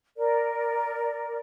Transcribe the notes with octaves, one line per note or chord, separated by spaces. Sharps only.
A#4 D5